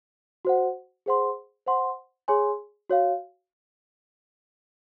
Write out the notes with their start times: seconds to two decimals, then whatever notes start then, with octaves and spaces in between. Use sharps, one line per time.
0.45 F#4 C5 F#5
1.06 G#4 C5 F#5 C6
1.66 C5 F#5 C6
2.28 G#4 C#5 G#5 C6
2.90 F#4 C#5 F5